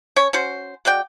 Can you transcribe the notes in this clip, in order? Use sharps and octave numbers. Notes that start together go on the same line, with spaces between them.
C#4 C#5
C#4 F#4 C5
G#3 F#4 D5 G5